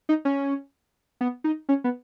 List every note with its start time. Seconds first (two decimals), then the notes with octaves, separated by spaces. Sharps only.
0.09 D#4
0.25 C#4
1.21 B3
1.44 D#4
1.69 C#4
1.84 B3